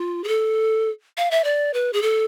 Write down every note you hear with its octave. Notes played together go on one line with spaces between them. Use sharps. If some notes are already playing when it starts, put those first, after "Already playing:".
Already playing: F4
G#4
A4
F5
E5
D5
B4
G#4
A4